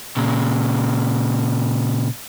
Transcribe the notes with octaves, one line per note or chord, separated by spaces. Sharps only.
A#2 C#3